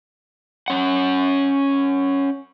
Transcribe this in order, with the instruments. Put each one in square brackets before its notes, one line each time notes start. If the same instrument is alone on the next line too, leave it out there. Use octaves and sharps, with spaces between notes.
[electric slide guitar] C#4 F#5